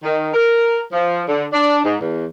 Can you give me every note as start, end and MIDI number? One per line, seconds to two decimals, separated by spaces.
0.02 0.30 51
0.33 0.80 70
0.92 1.21 53
1.28 1.45 50
1.52 1.79 62
1.84 1.96 44
2.00 2.25 40